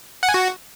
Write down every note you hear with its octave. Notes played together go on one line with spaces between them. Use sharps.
F#5
G#5
F#4